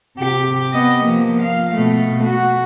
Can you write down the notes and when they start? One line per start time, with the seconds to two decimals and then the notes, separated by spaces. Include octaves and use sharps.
0.17 C3 G4
0.74 B3 D#5
1.03 F3 A#3
1.42 F5
1.75 B2 A3
2.24 F#4